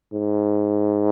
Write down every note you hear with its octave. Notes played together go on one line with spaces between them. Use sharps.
G#2